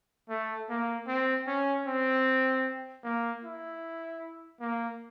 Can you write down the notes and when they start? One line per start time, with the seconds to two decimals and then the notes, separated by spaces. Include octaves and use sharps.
0.29 A3
0.69 A#3
1.07 C4
1.47 C#4
1.86 C4
3.04 A#3
3.42 E4
4.60 A#3